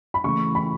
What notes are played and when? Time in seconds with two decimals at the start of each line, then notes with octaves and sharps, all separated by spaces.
0.14 B5
0.24 C#3 E3 A3 C#6
0.55 B5